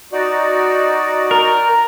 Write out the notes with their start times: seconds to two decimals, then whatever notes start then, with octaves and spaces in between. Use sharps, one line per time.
0.12 D#4 F#4 D5
1.31 A#4 A#5